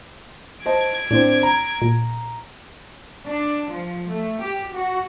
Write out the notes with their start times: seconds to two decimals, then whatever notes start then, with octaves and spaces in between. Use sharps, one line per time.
0.66 C5 D#5 A5 G#6 D7
1.11 A2 C4 D4
1.43 A#5
1.82 A#2
3.27 D4
3.71 F3
4.11 A3
4.42 G4
4.75 F#4